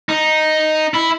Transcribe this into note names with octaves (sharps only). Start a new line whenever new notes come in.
D#4
E4